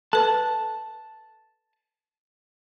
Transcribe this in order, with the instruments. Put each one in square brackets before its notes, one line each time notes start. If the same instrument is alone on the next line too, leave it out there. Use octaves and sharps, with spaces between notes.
[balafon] A4 B4 [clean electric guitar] A5